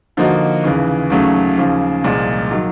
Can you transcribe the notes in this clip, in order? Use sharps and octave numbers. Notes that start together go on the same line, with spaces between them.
D3 F3 A#3 D#4 F#4
D#2 C#3 E3
D#2 C#3 F#3 A3 C#4
D#2 C#3 F3
C2 A#2 F3 G#3
D#3 F#3